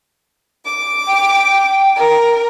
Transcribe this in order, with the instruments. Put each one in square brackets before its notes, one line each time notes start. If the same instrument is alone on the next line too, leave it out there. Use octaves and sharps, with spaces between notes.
[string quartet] D6
[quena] G5
[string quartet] A#4